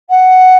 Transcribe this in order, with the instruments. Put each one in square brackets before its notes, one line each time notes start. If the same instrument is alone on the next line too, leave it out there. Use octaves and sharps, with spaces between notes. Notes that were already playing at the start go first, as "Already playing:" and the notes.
[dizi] F#5